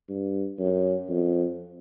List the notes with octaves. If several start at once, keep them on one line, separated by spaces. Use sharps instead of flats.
G2
F#2
F2